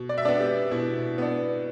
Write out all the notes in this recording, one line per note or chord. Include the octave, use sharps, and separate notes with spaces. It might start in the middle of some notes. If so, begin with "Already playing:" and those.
Already playing: B2
D5
E5
B3 D4 D5
G4
B2 E4
B3 D4